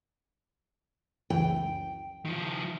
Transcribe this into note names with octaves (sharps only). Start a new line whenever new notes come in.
C#2 F#2 E3 G5
D#3 F3